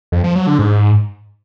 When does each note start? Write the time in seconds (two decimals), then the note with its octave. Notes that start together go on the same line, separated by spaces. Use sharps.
0.12 F2
0.24 F3
0.35 F#3
0.47 D3
0.59 G#2